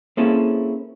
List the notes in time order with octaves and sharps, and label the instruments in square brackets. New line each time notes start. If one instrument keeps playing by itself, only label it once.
[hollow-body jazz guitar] A#3 C4 C#4 E4 G#4 A4